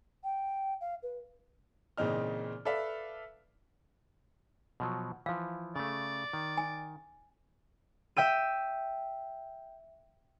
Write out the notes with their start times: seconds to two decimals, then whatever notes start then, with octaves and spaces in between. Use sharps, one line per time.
0.24 G5
0.81 F5
1.03 B4
1.97 A#2 C#3 E3 C4 D#4 F6
2.65 A4 B4 D5 E5 F5
4.80 B2 F3 F#3
5.26 E3 F3 F5
5.76 C#3 A3 D5
6.33 D#3
6.57 G#5
8.17 E5 G5 E6 D#7